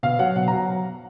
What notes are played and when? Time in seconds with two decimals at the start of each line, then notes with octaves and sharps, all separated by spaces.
0.03 B2 F5
0.19 F#3 F#5
0.36 B2 F#5
0.48 A#5
0.53 F#3